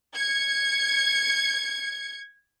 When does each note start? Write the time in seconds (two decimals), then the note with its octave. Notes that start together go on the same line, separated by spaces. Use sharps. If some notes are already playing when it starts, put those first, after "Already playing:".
0.14 G#6 C#7